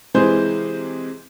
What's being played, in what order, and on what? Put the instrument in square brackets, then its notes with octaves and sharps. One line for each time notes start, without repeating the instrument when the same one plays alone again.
[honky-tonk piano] C3 E3 G#3 G#4 C5 G6